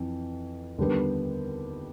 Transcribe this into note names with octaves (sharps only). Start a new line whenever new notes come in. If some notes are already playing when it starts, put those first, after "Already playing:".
Already playing: F2 E3
D#2 D3 G3 B3